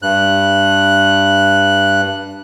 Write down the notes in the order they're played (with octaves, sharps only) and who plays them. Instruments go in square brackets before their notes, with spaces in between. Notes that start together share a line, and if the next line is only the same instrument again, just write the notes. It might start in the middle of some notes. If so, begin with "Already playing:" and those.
[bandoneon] G2 F#6